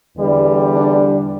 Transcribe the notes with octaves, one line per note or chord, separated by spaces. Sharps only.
E2 D3 G3
D4